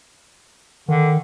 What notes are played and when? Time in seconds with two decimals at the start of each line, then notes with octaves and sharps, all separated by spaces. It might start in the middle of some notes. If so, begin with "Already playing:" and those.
0.88 D3 D#3